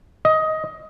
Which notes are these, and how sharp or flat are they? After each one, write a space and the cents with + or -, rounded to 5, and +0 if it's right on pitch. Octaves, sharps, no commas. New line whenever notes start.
D#5 +15